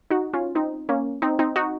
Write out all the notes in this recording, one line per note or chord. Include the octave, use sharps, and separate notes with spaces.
D#4 F#4
C#4 F4
C4 D#4
A#3 C#4
C4 D#4
C4 D#4
D#4 F#4